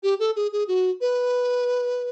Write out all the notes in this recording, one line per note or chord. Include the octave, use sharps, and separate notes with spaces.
G4
A4
G#4
G#4
F#4
B4